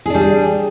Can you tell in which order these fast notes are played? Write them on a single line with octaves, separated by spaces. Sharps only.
G#4 D4 G3